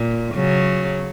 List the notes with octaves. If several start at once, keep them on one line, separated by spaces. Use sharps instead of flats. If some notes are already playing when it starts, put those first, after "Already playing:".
Already playing: A#2
C#3 F#3